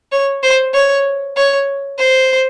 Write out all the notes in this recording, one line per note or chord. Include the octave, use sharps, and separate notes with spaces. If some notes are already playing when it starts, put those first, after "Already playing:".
C#5
C5
C#5
C#5
C5